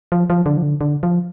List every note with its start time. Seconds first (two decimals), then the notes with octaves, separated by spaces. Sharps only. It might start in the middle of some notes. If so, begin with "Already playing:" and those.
0.12 F3
0.30 F3
0.46 D3
0.57 F3
0.63 D3
0.81 D3
1.03 F3